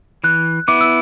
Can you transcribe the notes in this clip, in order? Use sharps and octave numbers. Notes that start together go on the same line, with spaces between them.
E3 F#6
B3 E4 D6
E6